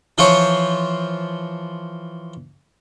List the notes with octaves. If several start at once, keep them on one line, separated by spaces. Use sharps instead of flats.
E3 F3 F4 C5 C#5